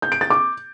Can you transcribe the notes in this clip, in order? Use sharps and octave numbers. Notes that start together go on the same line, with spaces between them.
G6
D7
A6
D6